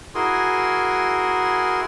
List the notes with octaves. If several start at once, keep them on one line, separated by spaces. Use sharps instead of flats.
E4 F#4 G#4 A#4 G#5 C6